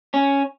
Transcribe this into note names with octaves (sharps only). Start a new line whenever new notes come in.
C#4